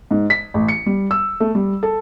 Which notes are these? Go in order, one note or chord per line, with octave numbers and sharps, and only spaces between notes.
G#2
B6
A1
C#7
G3
E6
A3
G3
A4